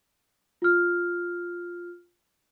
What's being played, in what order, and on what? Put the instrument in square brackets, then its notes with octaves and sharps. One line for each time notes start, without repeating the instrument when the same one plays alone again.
[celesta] F4 F6